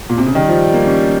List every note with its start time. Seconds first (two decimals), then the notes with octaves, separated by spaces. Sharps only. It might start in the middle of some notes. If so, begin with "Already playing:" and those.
0.10 A#2
0.18 C3
0.26 C#3
0.35 D#3 G3
0.49 F3
0.74 A#3
0.87 C#4